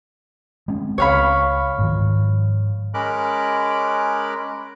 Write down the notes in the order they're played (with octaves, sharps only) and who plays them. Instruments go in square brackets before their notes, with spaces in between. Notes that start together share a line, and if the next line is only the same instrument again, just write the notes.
[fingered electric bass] G#3 C4 C#4
[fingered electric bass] C#2 [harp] C#5 F5 B5
[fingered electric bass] G#2 D#3 F3
[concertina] G#3 C#4 A#4 B5 D6 F#6